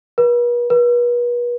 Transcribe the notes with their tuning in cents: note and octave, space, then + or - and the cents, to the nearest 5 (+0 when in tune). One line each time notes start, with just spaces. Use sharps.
B4 -45
B4 -40